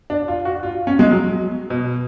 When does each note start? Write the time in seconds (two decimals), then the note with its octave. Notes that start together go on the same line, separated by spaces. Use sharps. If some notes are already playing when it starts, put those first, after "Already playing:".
0.10 D4
0.28 F4
0.45 F#4
0.63 F4
0.87 C#4
0.99 G#3
1.11 F#3
1.70 B2